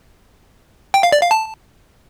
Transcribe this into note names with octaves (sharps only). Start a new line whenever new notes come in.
G5
F5
D5
F5
A5